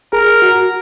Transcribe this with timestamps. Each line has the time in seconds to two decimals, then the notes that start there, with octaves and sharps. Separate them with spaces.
0.13 G#4 A#4
0.42 F#4